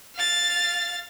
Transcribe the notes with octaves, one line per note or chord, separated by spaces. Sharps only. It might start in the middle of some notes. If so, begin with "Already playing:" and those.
F5 A6